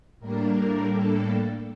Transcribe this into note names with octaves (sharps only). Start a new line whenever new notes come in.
A2 G3 A#3 D4 A#4
A4